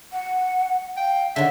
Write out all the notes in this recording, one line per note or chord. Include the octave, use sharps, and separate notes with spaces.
F#5
F5 G5
D3 D#3 C#5 E5